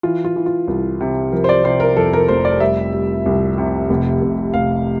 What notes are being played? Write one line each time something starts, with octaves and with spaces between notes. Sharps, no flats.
E3 F4
F4
E3
F4
C2
C3
F3 A#4
C5
D5
C3 C5
A#4
F2 A4
A#4
F1 C5
D5
G3 E5
G3
C2
C3
F1
F1
F1 F5